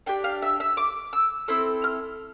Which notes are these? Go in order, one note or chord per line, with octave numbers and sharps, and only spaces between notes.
D4 G4 G5
F5
E5
E5
D6
E6
C4 E4 A4 E6
F6